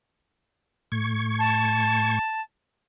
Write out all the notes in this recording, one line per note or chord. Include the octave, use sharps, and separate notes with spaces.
A2 C#6 G#6
A5